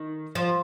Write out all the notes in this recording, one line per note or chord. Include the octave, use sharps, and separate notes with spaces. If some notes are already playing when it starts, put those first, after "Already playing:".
Already playing: D#3
F3